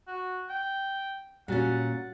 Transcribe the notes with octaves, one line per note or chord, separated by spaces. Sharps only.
F#4
G5
A#2 G3 C#4 F#4 F#5 A6